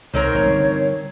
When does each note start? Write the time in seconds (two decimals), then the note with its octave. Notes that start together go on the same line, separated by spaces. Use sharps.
0.14 C2 C3 D#3 C4 A#4 C#5
0.35 A1
0.46 D3 G3